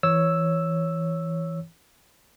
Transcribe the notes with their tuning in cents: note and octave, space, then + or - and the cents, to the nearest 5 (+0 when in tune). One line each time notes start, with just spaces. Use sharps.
E3 +0 C#5 +0 E6 +0